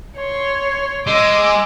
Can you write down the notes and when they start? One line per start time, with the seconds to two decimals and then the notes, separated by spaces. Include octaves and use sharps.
0.17 C#5 C6
1.07 G#3 D6 E6